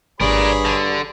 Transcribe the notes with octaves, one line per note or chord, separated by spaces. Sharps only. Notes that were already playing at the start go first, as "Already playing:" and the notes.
G#1 G2 G#4 A#4 C#5 D5 B5
D3